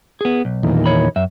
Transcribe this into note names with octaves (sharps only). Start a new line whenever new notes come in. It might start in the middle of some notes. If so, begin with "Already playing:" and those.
B3 G#4
B1
E2 A#2 D#3
C#5 B5
F#2 E5